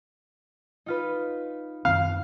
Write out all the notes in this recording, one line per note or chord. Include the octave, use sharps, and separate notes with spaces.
D#4 F4 B4
F#2 D#3 C4 F5